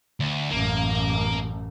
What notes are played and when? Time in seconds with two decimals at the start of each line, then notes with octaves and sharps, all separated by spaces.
0.20 D2
0.51 A1 F#2 A#3